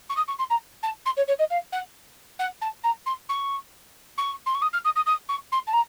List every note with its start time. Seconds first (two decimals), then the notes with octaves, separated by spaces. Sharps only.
0.10 C#6
0.17 D#6
0.28 C#6
0.39 C6
0.50 A#5
0.83 A5
1.06 C6
1.17 C#5
1.28 C#5
1.39 D#5
1.51 F5
1.72 F#5
2.39 F#5
2.62 A5
2.84 A#5
3.06 C6
3.29 C#6
4.18 C#6
4.46 C6
4.55 C#6
4.62 D#6
4.73 F6
4.85 D#6
4.96 D#6
5.06 D#6
5.29 C#6
5.52 C6
5.67 A5
5.73 A#5